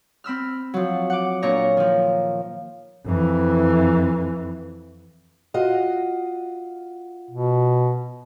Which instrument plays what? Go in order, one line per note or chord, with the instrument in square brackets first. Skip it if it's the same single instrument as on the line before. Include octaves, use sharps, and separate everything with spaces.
[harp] C4 B5 E6 F6
F3 F#3
F#5 D6
A#2 D4 C#5 A#5
D#3 F3
[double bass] F2 E3
[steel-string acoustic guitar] F4 F#4 D#5
[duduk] B2